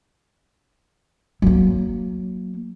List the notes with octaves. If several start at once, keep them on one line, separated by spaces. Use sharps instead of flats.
F#3 A#3